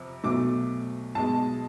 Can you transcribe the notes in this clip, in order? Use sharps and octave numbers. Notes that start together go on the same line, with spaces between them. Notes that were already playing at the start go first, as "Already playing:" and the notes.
Already playing: F2 C3
B1 B2 A3 D6
B1 B2 G#3 A5